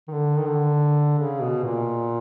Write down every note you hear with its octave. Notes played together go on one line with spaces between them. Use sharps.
D#3
D3
D#3
D3
C#3
B2
A#2